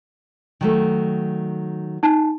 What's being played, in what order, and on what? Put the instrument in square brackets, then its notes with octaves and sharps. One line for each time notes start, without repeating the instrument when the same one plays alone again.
[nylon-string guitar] D#3 F#3 A3
[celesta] D#4 A5